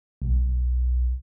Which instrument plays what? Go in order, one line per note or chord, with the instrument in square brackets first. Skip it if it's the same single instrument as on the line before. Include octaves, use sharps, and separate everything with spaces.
[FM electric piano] B1